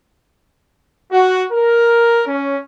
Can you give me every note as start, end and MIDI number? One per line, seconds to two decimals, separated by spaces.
1.12 1.44 66
1.53 2.21 70
2.27 2.57 61